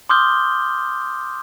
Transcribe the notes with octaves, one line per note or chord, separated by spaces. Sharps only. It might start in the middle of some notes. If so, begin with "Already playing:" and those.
C6 D6 D#6 F6 G6 G7